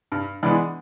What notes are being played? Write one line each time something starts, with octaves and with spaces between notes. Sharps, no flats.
G2
E3 G#3 B3 D4